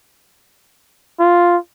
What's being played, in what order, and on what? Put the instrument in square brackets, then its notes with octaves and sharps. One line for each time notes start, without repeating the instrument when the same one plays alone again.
[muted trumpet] F4